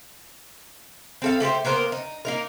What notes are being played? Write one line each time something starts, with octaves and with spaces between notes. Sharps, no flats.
C4 A4 F5
A3 G4 B4 C5
A#3 B3 A#4 C5
D#4
A#3 D#4 A#4